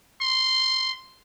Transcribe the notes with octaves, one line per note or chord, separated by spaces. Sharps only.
C6